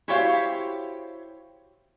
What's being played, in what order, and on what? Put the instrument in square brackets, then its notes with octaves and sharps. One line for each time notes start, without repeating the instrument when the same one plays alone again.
[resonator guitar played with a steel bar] E4 F#4 G4 C5 C#5 F5